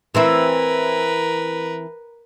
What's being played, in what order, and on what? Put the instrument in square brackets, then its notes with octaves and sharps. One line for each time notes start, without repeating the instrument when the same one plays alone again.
[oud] E3 C4 E4 [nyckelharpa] A#4 B4